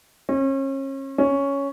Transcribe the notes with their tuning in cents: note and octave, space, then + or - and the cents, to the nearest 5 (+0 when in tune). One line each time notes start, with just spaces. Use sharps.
C#4 -35
C#4 +5